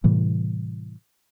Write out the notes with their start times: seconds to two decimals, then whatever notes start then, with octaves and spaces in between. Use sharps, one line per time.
0.04 A2 C3 E3 G3